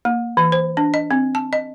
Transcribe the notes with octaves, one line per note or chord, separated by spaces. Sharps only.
A#3
E3
C5
D4
D#5
C4
A5
D#5